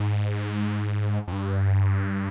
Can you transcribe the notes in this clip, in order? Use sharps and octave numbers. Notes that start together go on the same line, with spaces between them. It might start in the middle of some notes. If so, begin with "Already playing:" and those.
Already playing: G#2
F2
G2